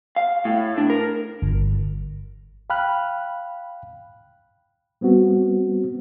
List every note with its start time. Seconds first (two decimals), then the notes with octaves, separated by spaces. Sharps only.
0.16 F5
0.45 A2
0.78 D4
0.90 A#4
1.42 G1
2.70 F5 G5 B5 F6 F#6
5.01 G3 B3 C4 F#4